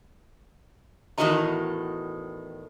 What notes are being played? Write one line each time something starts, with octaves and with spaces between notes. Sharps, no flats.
E2 A2 D#3 F#4 D#5 A#5